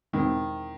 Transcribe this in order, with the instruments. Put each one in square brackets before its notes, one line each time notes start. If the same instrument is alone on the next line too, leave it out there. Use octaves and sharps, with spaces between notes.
[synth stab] E2 B2 G#3 C4 E4 [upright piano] D#3